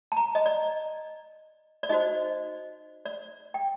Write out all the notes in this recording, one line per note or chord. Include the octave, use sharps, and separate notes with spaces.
A5
A#5
D#5
D5
D5
D#4 F#4 C5 D#5
D5
G5